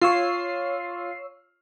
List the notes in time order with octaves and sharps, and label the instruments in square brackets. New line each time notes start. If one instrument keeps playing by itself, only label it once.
[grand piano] F4 [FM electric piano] C#5 E6 C7